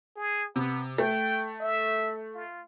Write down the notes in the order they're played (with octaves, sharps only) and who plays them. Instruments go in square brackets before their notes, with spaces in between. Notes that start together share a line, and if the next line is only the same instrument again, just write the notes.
[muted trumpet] G#4
[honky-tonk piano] C3 [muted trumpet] B3
[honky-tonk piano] A3 [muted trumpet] G5
[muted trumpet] E5
F4